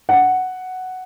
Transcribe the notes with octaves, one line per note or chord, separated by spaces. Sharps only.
F#5